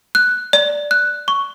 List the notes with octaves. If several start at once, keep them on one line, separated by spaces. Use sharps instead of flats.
F#6
D5
F#6
C#6